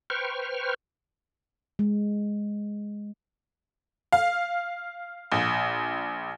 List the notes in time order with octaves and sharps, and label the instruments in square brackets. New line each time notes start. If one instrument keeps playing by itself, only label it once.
[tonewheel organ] B4 C5 G5 C#6 F6
[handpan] G#3
[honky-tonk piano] F5
A#1